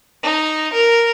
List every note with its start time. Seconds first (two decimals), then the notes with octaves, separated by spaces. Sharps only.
0.23 D#4
0.73 A#4